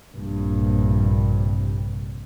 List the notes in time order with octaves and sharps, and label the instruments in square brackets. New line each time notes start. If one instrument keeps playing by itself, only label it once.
[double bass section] A#1 G2 C3